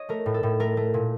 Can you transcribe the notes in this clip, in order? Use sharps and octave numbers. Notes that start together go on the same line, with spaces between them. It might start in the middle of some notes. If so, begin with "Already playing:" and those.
Already playing: C#5 D#5
A3 A#4
A2
A4
A2
A3 A#4
A3
A#2